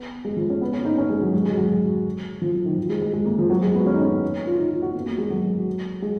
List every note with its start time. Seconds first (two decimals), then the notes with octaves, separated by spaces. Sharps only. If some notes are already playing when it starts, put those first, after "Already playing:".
Already playing: B3
0.25 G#3
0.36 F3
0.50 C#4
0.61 B3
0.73 C#4
0.85 D#4
0.98 C#4
1.10 G#3
1.21 F#3
1.34 G#3
1.45 G#3
1.57 F#3
2.42 F3
2.54 F#3
2.65 D#3
2.78 F3
2.89 G#3
3.02 G#3
3.13 G#3
3.25 A#3
3.38 F3
3.50 F#3
3.62 G#3
3.74 B3
3.86 C#4
3.93 D#4
4.02 C#4
4.47 F4
4.58 D#4
4.71 F4
4.82 F#4
4.95 B3
5.06 A#3
5.18 G#3
5.30 F#3
6.02 G#3